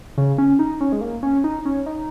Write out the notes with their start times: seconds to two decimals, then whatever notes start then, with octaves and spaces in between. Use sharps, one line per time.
0.18 C#3
0.38 C#4
0.59 D#4
0.81 C#4
0.92 G#3
1.01 A#3
1.23 C#4
1.44 D#4
1.65 C#4
1.86 D#4